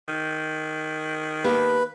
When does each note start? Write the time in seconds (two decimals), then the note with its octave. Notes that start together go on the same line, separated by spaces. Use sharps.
0.08 D#3
1.44 A#3 G4 B4 A5